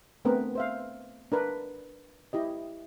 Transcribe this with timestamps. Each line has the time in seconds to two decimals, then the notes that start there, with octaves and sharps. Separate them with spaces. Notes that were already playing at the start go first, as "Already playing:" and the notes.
0.25 A3 B3 C4 D4 A#4 B4
0.55 C5 E5 F5
1.32 D4 A#4 B4
2.33 E4 G4 D#5